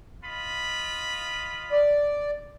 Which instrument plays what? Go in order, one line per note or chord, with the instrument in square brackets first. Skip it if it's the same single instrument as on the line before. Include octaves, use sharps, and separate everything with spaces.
[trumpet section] F4 D#5 B5
[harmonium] D5